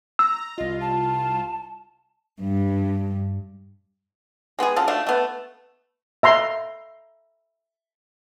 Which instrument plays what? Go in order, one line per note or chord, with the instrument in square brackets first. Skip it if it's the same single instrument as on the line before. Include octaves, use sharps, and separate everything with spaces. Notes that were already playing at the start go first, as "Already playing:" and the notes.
[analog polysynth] A#5 [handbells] E6
[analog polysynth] C2 F4 [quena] D#5
[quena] A5
[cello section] G2
[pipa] G#3 B3 G4 G#4
C#3 F#3 F4 A4
A3 D4 F#4 F5
A3 B3
[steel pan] E5 A#5 C6